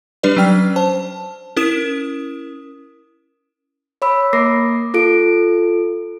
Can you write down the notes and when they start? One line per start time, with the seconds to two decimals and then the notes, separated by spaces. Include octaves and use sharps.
0.23 G3 D4 G4 B4 D5
0.37 F#3 C#4 G5 F6
0.76 C5 A5
1.56 C#4 E4 A#4 D#6 E7
4.02 C#5 B5 E6
4.33 A#3 A#4 D6 A#6 C7
4.94 F4 A4 D7